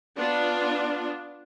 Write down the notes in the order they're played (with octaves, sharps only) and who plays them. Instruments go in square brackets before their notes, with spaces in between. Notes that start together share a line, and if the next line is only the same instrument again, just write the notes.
[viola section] B3 D4 F4